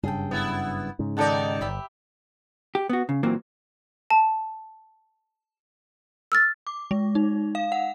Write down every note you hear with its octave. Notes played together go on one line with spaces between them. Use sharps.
F#1 G2 C#3 G#4 A4 G5
B3 E4
G#2 C#3
D#3 D#4 G4 A4 D5 F#5
G1 G4 E5 B5
G4
B3 F#4
C#3
A#2 E3 F#3 A#3 C4
A5
E6 F6 A6
D6
G#3
D#4
F5
F#5